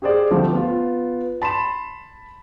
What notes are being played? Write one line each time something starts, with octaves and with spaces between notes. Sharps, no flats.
G4 G#4 C5 D5
D3 F3 G3 A3 C4 C5
B3 F4
A5 B5 C6 E7